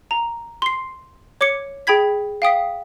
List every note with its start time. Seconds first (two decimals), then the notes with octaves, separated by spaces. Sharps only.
0.11 A#5
0.62 C6 C7
1.41 C#5 D6 G#6 C#7
1.87 G#4 G5 B5 G#6 B6
2.42 F5 G5 D#6 B6